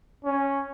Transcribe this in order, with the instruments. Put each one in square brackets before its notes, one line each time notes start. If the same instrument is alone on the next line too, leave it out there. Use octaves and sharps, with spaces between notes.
[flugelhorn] C#4